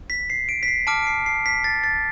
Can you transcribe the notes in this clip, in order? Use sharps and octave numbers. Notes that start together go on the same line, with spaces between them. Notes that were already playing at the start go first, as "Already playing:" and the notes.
B6
C7
D7
B6
C7
A5 D6 F6 D7
D7
C7
C7
B6
A6
A6